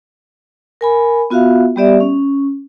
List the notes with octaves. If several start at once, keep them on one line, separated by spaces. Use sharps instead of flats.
A#4 G#5 B5
B3 F4 F#4 E5 F5
G3 B3 G4 D5 E5
C#4